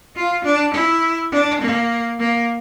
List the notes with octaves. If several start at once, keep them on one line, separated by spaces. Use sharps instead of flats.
F4
D4
E4
D4
A#3
A#3